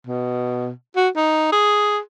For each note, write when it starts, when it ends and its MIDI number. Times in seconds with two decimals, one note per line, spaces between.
0.07 0.70 47
0.96 1.08 66
1.16 1.52 63
1.52 1.99 68